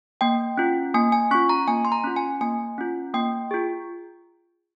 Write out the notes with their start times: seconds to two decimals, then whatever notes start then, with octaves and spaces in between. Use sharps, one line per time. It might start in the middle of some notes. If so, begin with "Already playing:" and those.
0.21 A#3 G5
0.58 C#4 F4
0.94 A#3 G#5
1.12 G#5
1.31 C#4 F4 C#6
1.49 A#5
1.68 A#3 G#5
1.85 C6
1.92 A#5
2.04 C#4 F4
2.16 G#5
2.41 A#3 G#5
2.78 C#4 F4
3.14 A#3 G5
3.51 F4 G#4